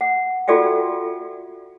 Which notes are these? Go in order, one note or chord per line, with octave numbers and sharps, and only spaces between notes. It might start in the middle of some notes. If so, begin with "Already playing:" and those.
F#5
F4 F#4 A4 D5 E5 G5